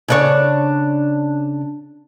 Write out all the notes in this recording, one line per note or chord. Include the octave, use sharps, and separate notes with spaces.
C#3 D4 C#5